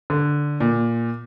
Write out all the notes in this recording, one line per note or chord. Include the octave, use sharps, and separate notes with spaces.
D3
A#2